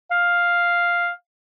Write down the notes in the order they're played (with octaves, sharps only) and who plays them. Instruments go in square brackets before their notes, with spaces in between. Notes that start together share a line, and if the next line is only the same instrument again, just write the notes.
[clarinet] F5